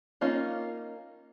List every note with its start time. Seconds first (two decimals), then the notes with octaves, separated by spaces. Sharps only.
0.21 A#3 C#4 D#4 F4